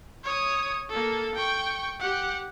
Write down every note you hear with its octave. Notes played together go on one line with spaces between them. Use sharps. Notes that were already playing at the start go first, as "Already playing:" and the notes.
C#5 D#6
A#3 A4
G5 C#6
G4 F#5